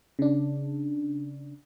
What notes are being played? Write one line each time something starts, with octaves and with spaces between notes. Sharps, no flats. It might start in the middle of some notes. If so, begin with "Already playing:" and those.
C#3 D4